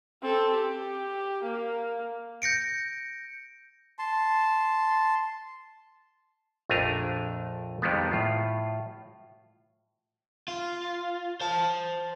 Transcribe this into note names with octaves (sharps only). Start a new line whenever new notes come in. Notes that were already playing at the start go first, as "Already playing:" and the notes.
C4 A4
G4
A#3
G6 A#6 C#7 D7
A5 C6
A#1 F2 A3 D4 G#5 A#5
F2 D#3 G3 G#3 B3
A2 F4
F4
C5 A5